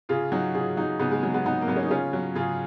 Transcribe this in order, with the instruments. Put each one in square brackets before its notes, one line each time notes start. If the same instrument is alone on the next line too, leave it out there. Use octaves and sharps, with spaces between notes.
[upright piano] C#3 F4 G#4
F#3 D#4 F#4
C#3 F4 G#4
F#3 D#4 F#4
C#3 B3 D#4
G#3
F#3 G#3
G#3 B3
C#3 B3 D#4
A#3
F#3 B3
C#4
D#4
C#3 C#4 F4
F#3
C#3 F4 G#4